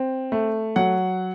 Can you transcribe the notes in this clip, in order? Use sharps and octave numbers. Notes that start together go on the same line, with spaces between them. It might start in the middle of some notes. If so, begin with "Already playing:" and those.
Already playing: C4
A3
F#3 F#5